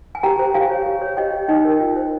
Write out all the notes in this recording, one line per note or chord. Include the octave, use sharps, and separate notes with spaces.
G#5
G4 G5 A#5
C5
G4 F5 G#5
C#5
G4
C#5
G4 D#5 G5
C#5
D#4 D#5 G5
A#4
F4
C5